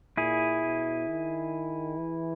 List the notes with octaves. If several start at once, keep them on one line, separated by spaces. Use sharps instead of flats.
A#2 E4 G#4
B2
D#3
E3